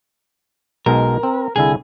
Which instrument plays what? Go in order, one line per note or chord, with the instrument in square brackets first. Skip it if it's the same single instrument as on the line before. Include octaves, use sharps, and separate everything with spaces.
[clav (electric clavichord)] B1 B2 G#3 [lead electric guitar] A#4
[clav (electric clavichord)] C4
[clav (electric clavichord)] C2 D3 E4 [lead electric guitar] G#4